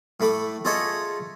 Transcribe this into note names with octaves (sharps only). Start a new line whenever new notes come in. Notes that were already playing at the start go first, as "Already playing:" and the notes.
A2 A3 B5 D6
F4 G#4 A4 C#5 D#5 E5